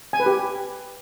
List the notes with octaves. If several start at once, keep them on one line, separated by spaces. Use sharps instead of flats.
G#5
B4
G4